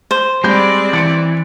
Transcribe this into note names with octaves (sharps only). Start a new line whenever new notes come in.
C5
G3 G#3 C4 D5 B5 G6
E3 A6 C#7 D7